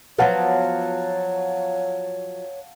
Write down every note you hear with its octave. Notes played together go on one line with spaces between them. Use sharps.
F3 F#3 B3 C#5 F5 F#5 A5